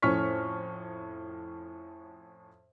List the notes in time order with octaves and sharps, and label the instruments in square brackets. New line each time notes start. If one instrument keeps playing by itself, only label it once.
[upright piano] F2 A2 C#4 C#6 F6 B6